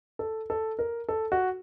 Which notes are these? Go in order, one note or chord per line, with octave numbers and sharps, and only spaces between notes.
A4
A4
A#4
A4
F#4